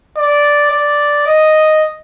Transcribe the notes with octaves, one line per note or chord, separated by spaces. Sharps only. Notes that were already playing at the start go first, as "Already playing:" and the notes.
D5
D5
D#5